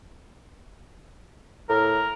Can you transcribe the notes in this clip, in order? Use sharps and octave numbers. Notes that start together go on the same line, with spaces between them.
A2 A#4